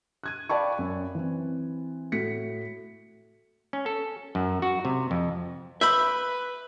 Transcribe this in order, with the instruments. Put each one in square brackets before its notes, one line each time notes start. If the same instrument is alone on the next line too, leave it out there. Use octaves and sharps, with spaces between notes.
[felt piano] F#6 G#6 D#7
D5 F5 G5 A5 B5 C#6
F#2
E3 C4
A2 F#4 B6 C#7
[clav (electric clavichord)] C#4
A4
F#2
F#4
C3
F2
[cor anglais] B4 [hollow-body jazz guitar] E5 [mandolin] B5 D6 G6